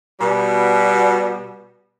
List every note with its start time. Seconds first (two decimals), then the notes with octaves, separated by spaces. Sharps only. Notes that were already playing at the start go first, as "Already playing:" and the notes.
0.20 B2 G3